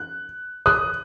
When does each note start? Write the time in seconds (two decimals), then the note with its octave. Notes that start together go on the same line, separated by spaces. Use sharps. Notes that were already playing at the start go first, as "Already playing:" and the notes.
Already playing: F#6
0.66 D#6 F#6